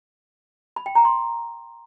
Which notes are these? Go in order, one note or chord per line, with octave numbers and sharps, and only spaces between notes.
B5
G5
A#5
C6